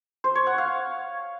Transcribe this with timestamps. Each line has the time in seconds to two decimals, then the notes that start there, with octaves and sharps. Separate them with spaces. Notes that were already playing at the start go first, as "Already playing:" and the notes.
0.24 C5
0.35 C#5
0.47 F#5
0.58 F5